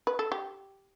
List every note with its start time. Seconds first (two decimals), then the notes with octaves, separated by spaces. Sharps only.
0.07 B4
0.19 A4
0.32 G4